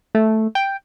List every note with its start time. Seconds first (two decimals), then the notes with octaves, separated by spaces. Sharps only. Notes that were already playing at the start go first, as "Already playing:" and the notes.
0.15 A3
0.55 G5